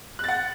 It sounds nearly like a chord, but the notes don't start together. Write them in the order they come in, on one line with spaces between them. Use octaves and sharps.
F#6 A6 F#5